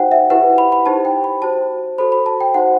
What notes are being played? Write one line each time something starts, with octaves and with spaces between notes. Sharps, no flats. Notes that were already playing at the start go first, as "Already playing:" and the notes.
Already playing: D#4 F#4 C5 F#5 G5
E5
E4 G4 B4 F#5
B5
B5
D#4 G4 C5 A5
G5
B5
F#4 C5 A5
F#4 A4 C5 B5
B5
A5
G5
D#4 F#4 C5 F#5